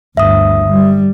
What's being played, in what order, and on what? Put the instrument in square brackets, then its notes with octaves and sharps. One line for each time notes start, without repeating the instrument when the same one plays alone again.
[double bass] G1 D2 [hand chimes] E5 D#6
[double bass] G3